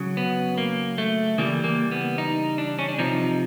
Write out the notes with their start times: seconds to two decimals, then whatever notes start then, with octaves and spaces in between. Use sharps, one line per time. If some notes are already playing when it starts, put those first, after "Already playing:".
Already playing: C#3 F#3
0.17 B3
0.58 A#3
0.98 A3
1.38 C#3 E3 G3 A#3
1.64 A#3
1.91 B3
2.18 D#4
2.58 D4
2.79 C#4
2.89 D4
2.98 C3 F3 D#4